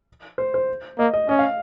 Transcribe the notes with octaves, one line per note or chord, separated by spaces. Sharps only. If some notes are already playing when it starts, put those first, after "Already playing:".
C5
C5
A#3 D#5
D#5
C#4 D#5
F5